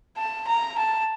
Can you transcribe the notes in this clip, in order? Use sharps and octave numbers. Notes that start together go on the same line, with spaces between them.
A5
A#5
A5